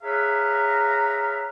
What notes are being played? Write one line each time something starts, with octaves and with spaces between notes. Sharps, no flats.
G#4 B4 C#5 E5 F5 A#5